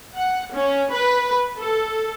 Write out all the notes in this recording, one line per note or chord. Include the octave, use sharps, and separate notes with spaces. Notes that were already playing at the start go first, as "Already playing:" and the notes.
F#5
C#4
B4
A4